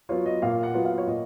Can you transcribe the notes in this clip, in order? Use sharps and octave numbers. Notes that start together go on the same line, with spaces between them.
F#3 B3 F4 C#5
D#5
A#2 F5
F#5
F#3 B3 F4
F5
C#5
A#2 D#5